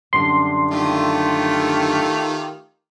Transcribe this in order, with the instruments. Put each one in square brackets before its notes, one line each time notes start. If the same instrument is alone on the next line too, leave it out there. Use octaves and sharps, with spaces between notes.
[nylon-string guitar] F#2 D3 G3 [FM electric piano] C6
[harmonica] D#3 F4 G4 [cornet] A3